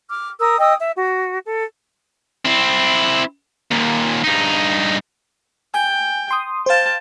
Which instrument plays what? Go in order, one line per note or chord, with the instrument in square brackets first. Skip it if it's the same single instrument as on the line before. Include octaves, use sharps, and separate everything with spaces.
[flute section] D6 F6
A#4 D#6 E6
D#5 G5 D#6 E6
E5
F#4
A4
[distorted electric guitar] C4 E4
D#2 A#2
G2 D#4
[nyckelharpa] G5 [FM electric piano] G#5
[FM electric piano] C6 D#6
[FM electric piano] C5 F5 [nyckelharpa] G5 A5